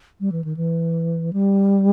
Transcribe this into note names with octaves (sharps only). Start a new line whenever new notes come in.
G3
E3
D#3
E3
G3